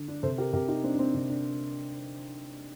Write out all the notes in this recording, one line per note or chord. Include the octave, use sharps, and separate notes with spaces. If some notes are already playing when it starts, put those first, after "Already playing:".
Already playing: D3
D4
C3 A4 C5
G4 A#4
C3 G4 A#4
D#4 G4
C4 D4
D4
C4
C3 D4
D4